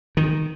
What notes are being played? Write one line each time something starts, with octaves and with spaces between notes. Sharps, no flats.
D#3